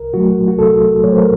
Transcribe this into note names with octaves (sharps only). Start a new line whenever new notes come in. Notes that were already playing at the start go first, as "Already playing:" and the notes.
Already playing: C2 A#4
A#2 F#3 A3 F#4
F#4
C2 A4
A#2 F#3 A3 C#5
C5
A#4